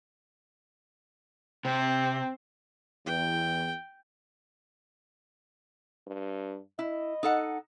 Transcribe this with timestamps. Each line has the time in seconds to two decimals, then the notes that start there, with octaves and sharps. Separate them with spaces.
1.65 C3 C4
3.06 E2 G5
6.07 G2
6.79 E4 D#5
7.23 D#4 A4 F#5